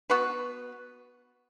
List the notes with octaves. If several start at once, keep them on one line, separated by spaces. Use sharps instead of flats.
B3 F#4 B4